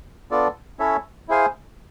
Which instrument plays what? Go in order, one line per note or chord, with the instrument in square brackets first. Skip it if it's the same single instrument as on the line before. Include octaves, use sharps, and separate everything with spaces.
[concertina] B3 D4 F4 A4 D5
C#4 E4 A4 C#5 E5
E4 G#4 C5 F5 G#5